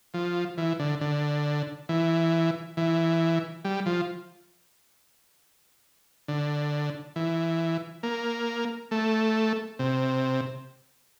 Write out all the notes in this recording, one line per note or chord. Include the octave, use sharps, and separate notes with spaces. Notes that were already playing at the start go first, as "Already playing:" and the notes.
F3
E3
D3
D3
E3
E3
G3
F3
D3
E3
A#3
A3
C3